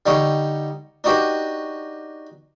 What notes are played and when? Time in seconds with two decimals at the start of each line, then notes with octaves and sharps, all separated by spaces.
0.06 D3 G3 D#4 C#5
1.04 D4 D#4 F#4 G4 B4